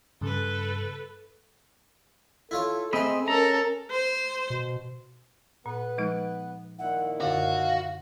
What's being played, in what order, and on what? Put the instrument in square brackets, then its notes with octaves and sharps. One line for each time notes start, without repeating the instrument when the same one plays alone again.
[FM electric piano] G2 C#3 [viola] A4 B4
[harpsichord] E4 F4 C#5 [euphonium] A4
[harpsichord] G#3 G#4 [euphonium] A3 [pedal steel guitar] C4 D#5 B5
[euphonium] C#4 [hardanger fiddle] A4 A#4 [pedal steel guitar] A#5
[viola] C5
[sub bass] B2
[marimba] A#2 [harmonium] B3 B4
[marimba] F3 G#3 D#4
[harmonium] A#2 D#3 E4 [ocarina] F#5
[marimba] F#2 D3 [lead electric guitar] F#4 [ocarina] F5